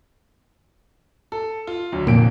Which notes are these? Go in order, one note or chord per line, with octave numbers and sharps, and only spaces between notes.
A4
F4
D2 F#3
F1 F2 A#2 D7